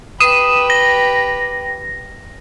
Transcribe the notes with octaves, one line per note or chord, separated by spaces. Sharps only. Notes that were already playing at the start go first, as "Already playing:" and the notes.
G4 B4 D#6 D#7 E7
A#6